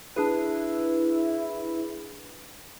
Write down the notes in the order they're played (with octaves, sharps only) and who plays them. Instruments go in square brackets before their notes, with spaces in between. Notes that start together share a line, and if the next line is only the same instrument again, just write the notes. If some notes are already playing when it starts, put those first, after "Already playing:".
[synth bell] D4 G#4 B4 [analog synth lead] E4